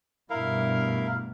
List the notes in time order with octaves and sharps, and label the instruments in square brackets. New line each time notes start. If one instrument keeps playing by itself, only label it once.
[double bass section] G2 B2 A3 [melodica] E4 A#4 F5